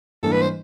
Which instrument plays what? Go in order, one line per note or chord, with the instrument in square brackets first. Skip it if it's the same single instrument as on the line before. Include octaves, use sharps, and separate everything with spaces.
[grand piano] G#2 E3 G3 A#3 D4 [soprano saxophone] A4
[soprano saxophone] B4
C5